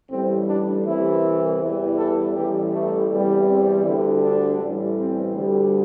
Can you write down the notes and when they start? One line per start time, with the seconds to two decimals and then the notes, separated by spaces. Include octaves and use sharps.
0.10 A1 A2 G3 C4
0.48 D4
0.85 C2 C3 E3 E4
1.60 E2 E3 G3
1.98 A4
2.35 A1 A2 E3 G3 G4
2.73 A3
3.10 E2 C3 E3 G3
3.48 C4
3.85 D2 D3 G3 E4
4.23 D4
4.60 A1 A2 E3 G3
4.98 C4
5.35 D2 D3 G3